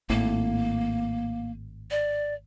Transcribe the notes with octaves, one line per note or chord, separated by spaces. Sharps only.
G#1 A2 A#3
D5